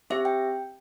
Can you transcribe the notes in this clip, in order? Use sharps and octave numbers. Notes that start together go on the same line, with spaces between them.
C4 G4 E5
G5